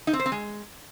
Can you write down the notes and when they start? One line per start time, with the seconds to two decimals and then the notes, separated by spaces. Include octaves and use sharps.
0.07 D#4
0.13 C4
0.20 C5
0.26 C4
0.32 G#3